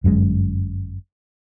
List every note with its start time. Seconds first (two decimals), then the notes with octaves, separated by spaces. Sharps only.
0.04 G1 F#2 A2 G#3